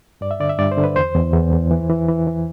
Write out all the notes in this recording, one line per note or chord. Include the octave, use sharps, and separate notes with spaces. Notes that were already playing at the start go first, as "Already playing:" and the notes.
G2 D5
E5
D3 D5
E5
G2 D5
C5
D3
B4
E2 C5
E2
E2
E2
E3
E3
E3
E3